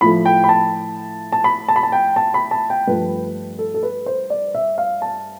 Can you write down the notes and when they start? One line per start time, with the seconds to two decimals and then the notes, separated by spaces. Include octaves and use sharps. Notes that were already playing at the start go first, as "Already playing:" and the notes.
0.01 A2 F3 A3 B5
0.25 G5
0.44 B5
0.49 A5
1.32 A5
1.44 B5
1.68 A5
1.76 B5
1.83 A5
1.92 G5
2.16 A5
2.34 B5
2.51 A5
2.70 G5
2.87 G2 F3 A3 B4
3.59 A4
3.74 A4
3.83 B4
4.06 C5
4.30 D5
4.55 E5
4.78 F5
5.02 A5